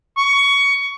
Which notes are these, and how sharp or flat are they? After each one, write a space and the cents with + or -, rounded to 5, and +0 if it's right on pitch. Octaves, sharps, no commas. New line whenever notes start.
C#6 +20